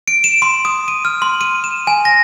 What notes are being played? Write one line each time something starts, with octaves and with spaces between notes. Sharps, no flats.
D7
E7
C6
D#6
D#7
F6
C6
D#7
E7
G#5
A#6